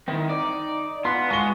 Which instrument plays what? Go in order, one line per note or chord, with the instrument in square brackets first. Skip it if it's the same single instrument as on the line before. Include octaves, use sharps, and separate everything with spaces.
[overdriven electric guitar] D#3 [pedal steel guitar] C4 E4
[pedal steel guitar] D#4 [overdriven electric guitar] D5
[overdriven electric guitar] B3 [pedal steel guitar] F4 F#5 [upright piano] C6
[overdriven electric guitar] G#3 [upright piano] C#6 G7